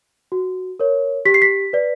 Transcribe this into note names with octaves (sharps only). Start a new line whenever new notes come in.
F#4
A#4 C#5
G4 B6
C7
B6
B4 D5